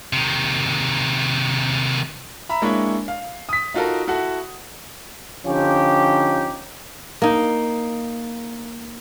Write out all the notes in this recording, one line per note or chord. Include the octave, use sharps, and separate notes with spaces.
C3 D#3
E5 A#5 B5
G#3 A#3 D4 E4 C#5
F5
D#6 B6
D#4 F4 F#4 A4 A#4
E4 F#4 A4 F#5
D3 F3 C#4 D#4 G4
A#3 D#4